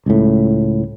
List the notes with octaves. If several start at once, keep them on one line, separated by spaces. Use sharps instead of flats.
C#2 A2